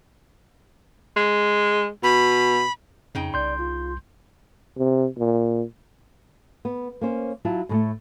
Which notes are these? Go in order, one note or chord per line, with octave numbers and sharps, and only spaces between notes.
G#3
B2 B5
F2 C#3 D#4 G5
C2 D5 C6 G6
F4
C3
A#2
B3
A#3 C#4 C5
F#3 E4 F4 A5
A2 G#3 A3